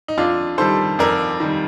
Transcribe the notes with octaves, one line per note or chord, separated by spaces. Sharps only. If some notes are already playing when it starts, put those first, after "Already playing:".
D#4
F2 D4 F4
D#3 G3 A4 C5
F2 A#4 D5
D#3 G3